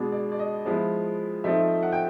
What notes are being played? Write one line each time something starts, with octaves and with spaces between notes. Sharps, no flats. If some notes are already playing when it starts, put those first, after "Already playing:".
Already playing: B2 G#3 B3 D4
D5
D5
D#5
F3 G#3 B3 E4
F3 A3 C4 D#4 E5
F#5
G5